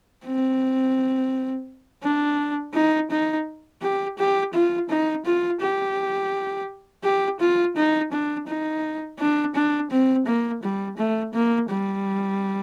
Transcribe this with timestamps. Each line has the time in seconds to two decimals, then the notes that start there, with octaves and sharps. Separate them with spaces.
0.25 C4
2.03 D4
2.74 D#4
3.11 D#4
3.82 G4
4.18 G4
4.54 F4
4.90 D#4
5.26 F4
5.61 G4
7.04 G4
7.40 F4
7.76 D#4
8.12 D4
8.48 D#4
9.19 D4
9.55 D4
9.91 C4
10.26 A#3
10.63 G3
10.97 A3
11.34 A#3
11.69 G3